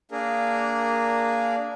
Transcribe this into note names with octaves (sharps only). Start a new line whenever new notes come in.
A#3 D4 G#4 A#4